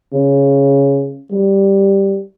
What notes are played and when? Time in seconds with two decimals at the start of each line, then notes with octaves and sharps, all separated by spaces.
0.13 C#3
1.31 G3